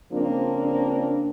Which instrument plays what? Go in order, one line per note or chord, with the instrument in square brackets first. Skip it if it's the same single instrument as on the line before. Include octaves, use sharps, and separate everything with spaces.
[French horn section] C#3 F3 A#3 C4 D4